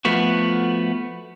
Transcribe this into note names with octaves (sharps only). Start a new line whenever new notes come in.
F3 A3 B3 F#4